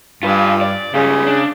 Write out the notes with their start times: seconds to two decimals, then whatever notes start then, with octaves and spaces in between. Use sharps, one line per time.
0.23 G2 F4 B4
0.61 D5
0.94 C#2 C#3 G3
1.27 D4